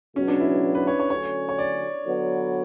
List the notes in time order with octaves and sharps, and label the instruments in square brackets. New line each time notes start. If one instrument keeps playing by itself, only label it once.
[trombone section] C#2 B2 F#3 [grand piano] C#4
[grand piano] D4
E4
B4
C#5
C#5
[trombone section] D2 D3 F#3 C#4 [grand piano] C#5
[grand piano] C#5
D5
[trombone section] D3 F#3 B3